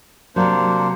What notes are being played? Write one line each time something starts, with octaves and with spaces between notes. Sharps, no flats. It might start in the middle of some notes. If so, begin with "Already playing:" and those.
C3 F#3 A#3 D4 C5